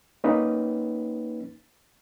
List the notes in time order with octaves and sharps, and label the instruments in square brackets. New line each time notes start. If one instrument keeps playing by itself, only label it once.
[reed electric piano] A#3 C#4 D#4 B4